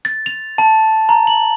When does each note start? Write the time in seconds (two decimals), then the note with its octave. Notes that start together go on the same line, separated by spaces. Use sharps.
0.05 A6
0.26 F7
0.58 A5
1.09 A#5
1.27 F#7